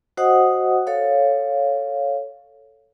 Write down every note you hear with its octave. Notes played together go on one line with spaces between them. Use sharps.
F#4 C5 D#5 F#5 D#6
A4 C#5 F5